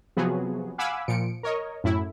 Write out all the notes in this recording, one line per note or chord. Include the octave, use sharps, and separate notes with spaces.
C3 F3 F#3 B3 F#4 G#4
F5 F#5 G#5 B5 D6 E6
A#2 F3 C#7 D7
A#4 C#5 D#5
F#2 A2 E4